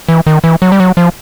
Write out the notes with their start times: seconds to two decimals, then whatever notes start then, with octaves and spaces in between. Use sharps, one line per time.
0.09 E3
0.27 D#3
0.44 E3
0.62 F#3
0.72 G3
0.80 F#3
0.97 F3